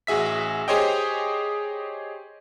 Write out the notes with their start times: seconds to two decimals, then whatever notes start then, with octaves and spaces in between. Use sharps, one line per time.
0.07 A1 F#4 G#4 E5 B6
0.68 G4 G#4 C5 C#5 D#5 G5